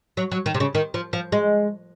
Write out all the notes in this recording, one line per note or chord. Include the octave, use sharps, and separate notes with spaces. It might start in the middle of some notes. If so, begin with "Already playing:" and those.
F#3
F#3
D#3
C3
C#3
D#3
F3
F3
G#3